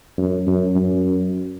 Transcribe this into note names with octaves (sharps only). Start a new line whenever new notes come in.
F#2
F#2
F#2